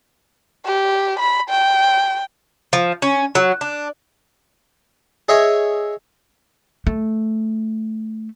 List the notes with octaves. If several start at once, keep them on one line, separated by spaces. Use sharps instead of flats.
G4
B5
G5
F3
C#4
F#3
D4
G#4 C#5 D#5 E5
A3